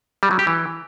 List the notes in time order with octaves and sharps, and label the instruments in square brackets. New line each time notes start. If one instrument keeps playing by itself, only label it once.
[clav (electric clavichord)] G3
F#3
G4
E3